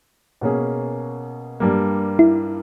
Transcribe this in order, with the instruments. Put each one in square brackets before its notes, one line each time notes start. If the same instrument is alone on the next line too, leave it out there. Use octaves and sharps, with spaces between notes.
[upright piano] B2 A#3 C#4 G#4
G2 G3 A#3
[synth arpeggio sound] E4